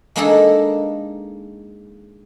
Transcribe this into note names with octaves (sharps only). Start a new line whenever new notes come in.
G#3 A#3 D4 D#4 G#4 A4